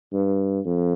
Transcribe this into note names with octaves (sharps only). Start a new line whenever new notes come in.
G2
F2